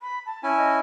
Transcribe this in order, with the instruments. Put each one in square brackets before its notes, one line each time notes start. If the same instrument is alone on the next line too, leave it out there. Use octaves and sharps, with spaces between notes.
[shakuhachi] B5
A5
[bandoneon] C#4 E4 G#5
[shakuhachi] D#5